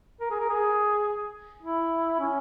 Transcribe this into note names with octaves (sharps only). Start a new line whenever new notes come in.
A#4
G#4
A#4
G#4
E4
C#4